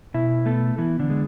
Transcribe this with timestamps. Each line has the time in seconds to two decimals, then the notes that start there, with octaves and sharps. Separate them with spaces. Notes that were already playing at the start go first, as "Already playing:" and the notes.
0.14 B2 E4 E5
0.46 A3 B3 A4
0.78 E3 B3 E4
0.99 D3 D4
1.10 G#3